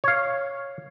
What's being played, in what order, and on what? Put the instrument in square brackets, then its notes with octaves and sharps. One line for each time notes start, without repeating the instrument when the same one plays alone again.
[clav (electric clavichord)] C#5 F5